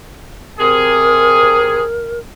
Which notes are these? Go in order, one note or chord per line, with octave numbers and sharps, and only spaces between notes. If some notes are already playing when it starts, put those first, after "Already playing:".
C3 G#4 A#4